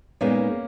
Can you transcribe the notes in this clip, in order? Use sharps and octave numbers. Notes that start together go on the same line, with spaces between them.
A#2 G#3 A#3 B3 C#4 D#4